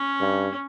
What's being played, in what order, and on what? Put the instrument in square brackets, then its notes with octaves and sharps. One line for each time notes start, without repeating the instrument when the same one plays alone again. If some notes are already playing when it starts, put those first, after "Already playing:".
Already playing: [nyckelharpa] C#4
[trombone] G2